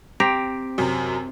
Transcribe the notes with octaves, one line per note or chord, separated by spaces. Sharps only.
C4 G4 A#5
F#2 C3